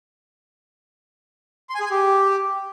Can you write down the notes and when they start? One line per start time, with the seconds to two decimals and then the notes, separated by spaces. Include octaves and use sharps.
1.70 C6
1.75 G#5
1.80 G#4
1.85 G#5
1.91 G4